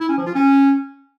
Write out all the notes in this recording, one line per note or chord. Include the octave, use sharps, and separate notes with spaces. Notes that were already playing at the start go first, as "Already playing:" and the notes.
E4
C#4
F3
F4
C#4